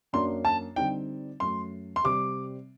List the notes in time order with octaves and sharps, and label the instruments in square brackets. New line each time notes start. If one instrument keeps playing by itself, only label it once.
[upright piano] F#2 F#3 A#3 D4 [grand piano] C6
[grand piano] A5
[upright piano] D3 G3 C4 D#4 [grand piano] G5
[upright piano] F#2 F#3 A3 [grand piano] C6
[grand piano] C6
[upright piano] C3 G3 C4 G4 [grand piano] D6